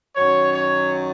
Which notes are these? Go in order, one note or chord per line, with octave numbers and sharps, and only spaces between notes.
F#2 D#3 F#3 C#5
C#5